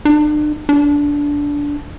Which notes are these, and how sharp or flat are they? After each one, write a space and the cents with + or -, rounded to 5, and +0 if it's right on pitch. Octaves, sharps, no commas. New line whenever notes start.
D4 +40
D4 -15